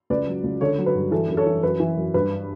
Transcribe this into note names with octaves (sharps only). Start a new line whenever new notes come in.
C#2 B4 D5
F#3
C#2
D3 A4 C#5
F#3
B4
G2
E3 A4
F#2
A4 C#5
E3
F#2 B4
E3
F#2
G2 B4